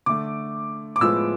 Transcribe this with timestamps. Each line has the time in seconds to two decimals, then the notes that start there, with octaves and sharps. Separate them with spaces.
0.06 D3 A3 D6
0.96 D6
1.00 A2 F3 G#3 B3 E6